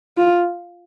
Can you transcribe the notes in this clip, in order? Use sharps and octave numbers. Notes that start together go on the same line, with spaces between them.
F4